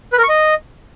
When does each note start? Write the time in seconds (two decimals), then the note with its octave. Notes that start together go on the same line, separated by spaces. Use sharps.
0.13 B4
0.18 A#4
0.23 C#6
0.29 D#5